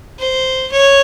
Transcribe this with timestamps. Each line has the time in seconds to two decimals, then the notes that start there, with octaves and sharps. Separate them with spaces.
0.19 C5
0.72 C#5